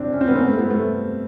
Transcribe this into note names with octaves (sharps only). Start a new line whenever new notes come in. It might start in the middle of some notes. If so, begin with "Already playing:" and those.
Already playing: C4 D4
C#4
C4
B3 C#4
A#3 C4
A3 B3
A3 B3
A3 B3